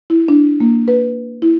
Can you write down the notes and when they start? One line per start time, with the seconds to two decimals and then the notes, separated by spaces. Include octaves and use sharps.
0.10 E4
0.28 D4
0.60 A#3
0.88 B4
1.42 E4